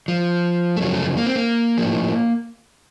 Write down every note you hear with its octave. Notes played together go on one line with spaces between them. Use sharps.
F3
A3
F#2 C#3 F3 F#3
A3
A#3
C4
A#3
A2 F3